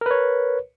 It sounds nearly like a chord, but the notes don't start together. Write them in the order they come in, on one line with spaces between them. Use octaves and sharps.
A#4 B4 C#5